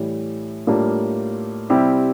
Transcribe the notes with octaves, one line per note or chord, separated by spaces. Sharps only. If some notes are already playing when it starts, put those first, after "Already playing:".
Already playing: A2 E3 G3
A2 G3 A#3 D4 F4
C3 G3 C4 E4 G4